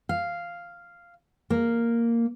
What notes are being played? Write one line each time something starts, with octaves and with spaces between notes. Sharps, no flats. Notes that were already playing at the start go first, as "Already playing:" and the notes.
F5
A#3